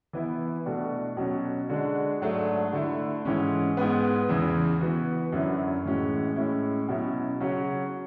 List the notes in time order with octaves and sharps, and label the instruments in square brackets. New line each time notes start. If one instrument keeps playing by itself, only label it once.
[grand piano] E3 B3 E4
B2 A3 D4 F#4
B2 F#3 C#4
D3 G#3 D4 F#4
G#2 F#3 A3 D4
D3 A3 E4
G#2 E3 G#3 C#4
G#2 G#3 B3
E2 C#3 E3
E3 B3 F#4
F#2 D3 F#3 C#4 E4
A2 E3 G#3 C#4 F#4
A2 G#3 C#4 E4
B2 F#3 C#4 E4
C#3 F#3 C#4 F#4